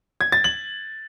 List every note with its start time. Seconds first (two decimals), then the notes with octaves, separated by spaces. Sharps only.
0.21 G#6
0.32 A6
0.44 F#7